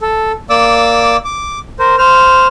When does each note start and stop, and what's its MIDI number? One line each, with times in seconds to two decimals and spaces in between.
0.01 0.32 69
0.50 1.17 58
0.50 1.17 74
0.50 1.17 86
0.50 1.17 88
1.25 1.59 86
1.79 1.96 70
1.79 1.96 72
1.98 2.47 72
1.98 2.47 89